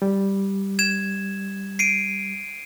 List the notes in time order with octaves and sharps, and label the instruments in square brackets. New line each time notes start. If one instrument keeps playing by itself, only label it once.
[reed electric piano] G3
[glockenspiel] G#6 E7
C7 D7 D#7